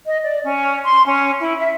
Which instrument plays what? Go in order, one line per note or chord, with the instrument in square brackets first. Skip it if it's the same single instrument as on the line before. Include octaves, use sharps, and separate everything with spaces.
[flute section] D#5
D5
C#4
C6
C#4
E4
E5